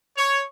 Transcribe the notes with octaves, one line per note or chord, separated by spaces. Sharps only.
C#5